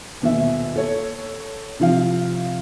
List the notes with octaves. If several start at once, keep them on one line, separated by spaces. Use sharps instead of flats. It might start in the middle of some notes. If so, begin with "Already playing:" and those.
D#1 B2 E5
A4 C#5
C3 F3 F5